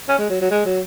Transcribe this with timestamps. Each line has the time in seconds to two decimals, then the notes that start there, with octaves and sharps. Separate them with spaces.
0.08 C#4
0.18 G#3
0.29 F#3
0.41 F#3
0.51 G#3
0.65 F#3